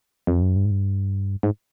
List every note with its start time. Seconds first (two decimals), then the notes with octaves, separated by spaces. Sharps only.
0.27 F2
0.42 F#2
0.56 G2
0.65 G#2
0.71 G2
1.43 G#2